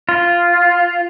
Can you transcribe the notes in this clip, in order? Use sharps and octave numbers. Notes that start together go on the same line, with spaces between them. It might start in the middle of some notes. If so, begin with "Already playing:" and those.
F4